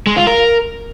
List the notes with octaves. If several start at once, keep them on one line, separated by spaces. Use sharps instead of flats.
G#3
F4
A#4